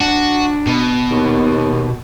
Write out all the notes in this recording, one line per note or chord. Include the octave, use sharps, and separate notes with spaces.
D4 F#4
B2
D#2